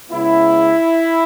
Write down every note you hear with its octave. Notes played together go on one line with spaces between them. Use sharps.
C#3 G#3 B3 E4